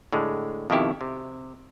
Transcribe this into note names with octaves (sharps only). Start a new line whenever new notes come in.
A2 D3 G#3
F2 B2 D#3 E4 G4
C3